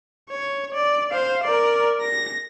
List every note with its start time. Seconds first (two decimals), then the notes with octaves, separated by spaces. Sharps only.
0.30 C#5
0.74 D5
1.11 C5 F5
1.44 A#4 D5
2.02 A#6